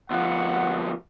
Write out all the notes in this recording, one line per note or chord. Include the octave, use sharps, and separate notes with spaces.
D2 F3 F#5